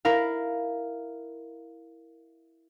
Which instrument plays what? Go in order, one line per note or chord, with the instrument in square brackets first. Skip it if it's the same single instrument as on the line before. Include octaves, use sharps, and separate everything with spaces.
[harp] E4 A#4 F5